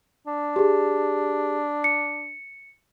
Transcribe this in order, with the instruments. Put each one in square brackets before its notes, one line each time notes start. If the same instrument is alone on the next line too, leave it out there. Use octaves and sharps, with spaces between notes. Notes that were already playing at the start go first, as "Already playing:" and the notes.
[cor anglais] D4
[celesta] G4 G#4
C#7